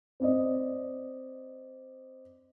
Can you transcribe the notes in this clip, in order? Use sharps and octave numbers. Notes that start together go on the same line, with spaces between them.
C4 D5 D#5